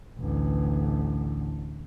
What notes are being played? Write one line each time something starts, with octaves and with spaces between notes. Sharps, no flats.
A1 D2